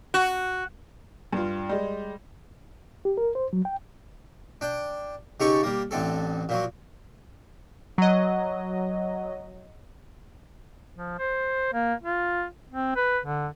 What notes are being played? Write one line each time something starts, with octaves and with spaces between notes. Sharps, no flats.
F#4
G2 F4
G3 G#3
G4
A#4
C5
F#3
G5
D4 G5
C#3 D#4 G4 A4 C#6
G3 A#3
A1 D3 C4 A4
A#2 F3 F#3
F#3 D#5
F3
C5
A#3
F4
C4
B4
D3